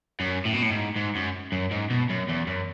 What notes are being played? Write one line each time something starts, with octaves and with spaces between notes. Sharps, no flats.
F#2
A2
B2
A2
G#2
G#2
F#2
F#2
G#2
B2
F#2
E2
F#2